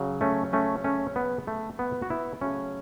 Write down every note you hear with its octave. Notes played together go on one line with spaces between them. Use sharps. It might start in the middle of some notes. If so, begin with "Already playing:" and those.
Already playing: C#3 F#3
A3 C#4
A3 C#4
A3 C#4
B3
A3
B3
F#4
B3 E4
C#3 F#3 A3 C#4 F#4